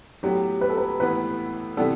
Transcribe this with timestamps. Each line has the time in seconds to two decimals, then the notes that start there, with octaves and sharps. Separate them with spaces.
0.23 A2 F#3 B3 G4
0.61 B4
0.70 A4
0.78 B4
1.00 A2 E3 B3 B4
1.77 C3 E3 G3 B3 A4